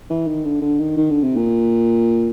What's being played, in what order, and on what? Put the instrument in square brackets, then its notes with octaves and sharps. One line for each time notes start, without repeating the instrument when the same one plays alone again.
[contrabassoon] E3
D#3
D3
D3
D#3
D#3
D3
C3
A#2